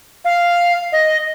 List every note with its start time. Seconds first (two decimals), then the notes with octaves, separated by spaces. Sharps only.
0.25 F5
0.92 D#5